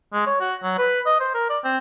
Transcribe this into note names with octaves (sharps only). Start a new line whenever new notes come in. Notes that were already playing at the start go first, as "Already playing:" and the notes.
G#3
C#5
F#4
F#3
B4
D#5
C5
A#4
D5
C4